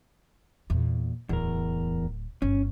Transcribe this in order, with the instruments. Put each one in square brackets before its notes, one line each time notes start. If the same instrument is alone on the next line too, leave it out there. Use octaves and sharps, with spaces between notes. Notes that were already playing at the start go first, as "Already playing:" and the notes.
[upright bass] E2 A#2
[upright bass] D1 [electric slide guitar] E2 A#4
[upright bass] G1 [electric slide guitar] C#4